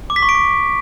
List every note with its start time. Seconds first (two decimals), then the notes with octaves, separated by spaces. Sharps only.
0.10 D6
0.16 B6
0.22 C#6
0.29 D7
0.35 D6